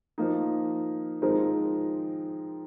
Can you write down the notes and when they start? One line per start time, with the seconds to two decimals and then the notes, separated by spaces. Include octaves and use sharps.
0.18 F3 A#3 D#4
1.22 F3 G#3 C4 D#4 A#4